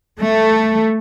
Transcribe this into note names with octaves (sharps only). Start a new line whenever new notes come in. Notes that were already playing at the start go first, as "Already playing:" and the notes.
A3